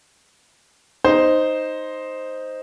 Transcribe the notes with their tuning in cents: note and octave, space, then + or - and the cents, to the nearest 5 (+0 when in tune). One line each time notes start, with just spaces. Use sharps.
D#4 +0 C5 +0